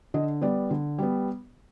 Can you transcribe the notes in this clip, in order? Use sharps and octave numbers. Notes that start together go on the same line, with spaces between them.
D3 D#5
G3 B3 D5
D3
G3 B3